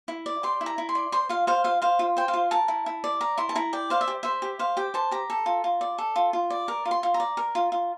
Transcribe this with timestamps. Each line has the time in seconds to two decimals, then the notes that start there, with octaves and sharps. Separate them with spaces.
0.08 E4
0.26 D5
0.43 G4 C6
0.61 E4
0.66 A#5
0.78 E4
0.89 C6
0.95 D5
1.12 C5 C6
1.29 F4 F5
1.47 C5 F5
1.64 F4 F5
1.82 C5 F5
1.99 F4
2.17 C5 G5
2.28 F5
2.34 F4
2.51 A#4 A5
2.68 E4
2.86 E4
3.04 D5
3.21 A#4 A#5
3.38 E4 C6
3.49 A5
3.55 E4 A#5
3.73 D5 G5
3.90 C5 F5
4.01 E5
4.08 G4
4.23 C5 E5
4.42 G4
4.59 C5 F5
4.77 G4 G5
4.94 C5 A5
5.11 G4 A#5
5.30 A4
5.46 F4
5.64 F4
5.81 D5
5.98 A4
6.16 F4
6.33 F4
6.50 D5
6.68 A#4
6.85 F4
6.91 C6
7.03 F4
7.14 A#5
7.20 D5
7.37 A#4
7.55 F4
7.72 F4